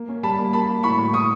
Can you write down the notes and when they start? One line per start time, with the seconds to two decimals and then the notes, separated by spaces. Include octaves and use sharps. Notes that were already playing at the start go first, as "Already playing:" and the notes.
Already playing: A#3
0.09 C#4
0.23 G3 A5 B5
0.38 A#3
0.53 A#3 A5 B5
0.69 A#3
0.83 A2 B5 C#6
0.98 A2
1.13 C#6 D#6